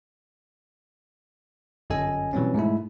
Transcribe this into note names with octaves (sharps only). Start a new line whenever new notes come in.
G1 F#2 C#4 A4 D#5 G#5
B2 E3 F#3 G3 C4 C#4
G#2 G#3 A3 E4